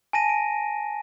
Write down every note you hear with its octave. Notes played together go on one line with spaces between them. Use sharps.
G#5 A5 A#6 D#7
D7